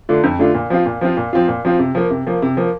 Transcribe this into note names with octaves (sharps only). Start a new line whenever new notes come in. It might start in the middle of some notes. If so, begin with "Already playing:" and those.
D3 A3 D4 F4
F2
D3 A3 D4 F4
A#2
F3 C4 F4
A#2
F3 C4 F4
A#2
F3 C4 F4
A#2
F3 C4 F4
C3
F3 A#3
C3
F3 A#3
C3
F3 A#3